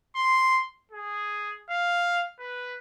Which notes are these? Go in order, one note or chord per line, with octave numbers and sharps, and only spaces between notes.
C6
G#4
F5
B4